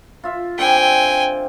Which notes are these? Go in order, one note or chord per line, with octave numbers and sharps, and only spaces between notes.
F4 E5
D3 G3 C4 G5 G#5